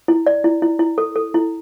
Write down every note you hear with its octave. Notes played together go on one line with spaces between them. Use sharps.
E4
D5
E4
E4
E4
A4
A4
E4